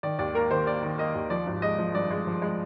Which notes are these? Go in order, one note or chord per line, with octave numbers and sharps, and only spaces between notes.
D#3 D5
D#2 D5
A#3 A#4
D#3 C5
A#3 D5
D#3
A#3 D#5
D#2
F3 D5
G#1
G#3 D#5
F3
G2 D5
G#3
F3
G#3